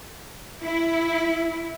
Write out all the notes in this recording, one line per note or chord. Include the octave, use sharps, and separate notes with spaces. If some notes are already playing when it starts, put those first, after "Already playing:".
E4